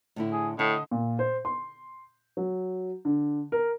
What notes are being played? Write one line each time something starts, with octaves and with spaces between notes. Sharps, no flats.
A2 D3 E4
G#4
A2 D3 D#5
A#2
C5
C6
F#3
D3
A#4